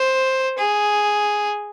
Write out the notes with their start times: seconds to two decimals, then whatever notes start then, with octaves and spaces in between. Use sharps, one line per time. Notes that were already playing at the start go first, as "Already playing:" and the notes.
Already playing: C5
0.58 G#4